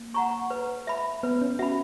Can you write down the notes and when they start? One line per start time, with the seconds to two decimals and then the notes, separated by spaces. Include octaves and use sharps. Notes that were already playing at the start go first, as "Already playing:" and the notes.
Already playing: A#3
0.14 F#5 A#5 C#6
0.50 B4
0.87 E5 B5
1.23 B3 B4
1.42 C#4
1.59 F#4 E5 B5